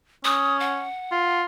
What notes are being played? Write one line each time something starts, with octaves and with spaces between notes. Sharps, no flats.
C#4 D#6
F#5
F4